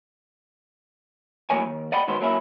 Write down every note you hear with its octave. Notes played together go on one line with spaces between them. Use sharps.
A2 F3 F#3 A#3 C#5 G#5
D#2
D5 D#5 F#5 G5 B5
B1 D#3 F#3 G#3 B3 C5
F#3 A#3 C#4 E4